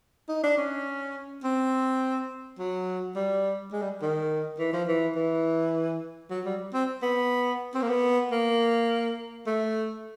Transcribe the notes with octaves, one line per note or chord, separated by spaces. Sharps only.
D#4
D4
C#4
C4
F#3
G3
G#3
G3
D#3
E3
F3
E3
E3
F#3
G3
C4
B3
C4
A#3
B3
A#3
A3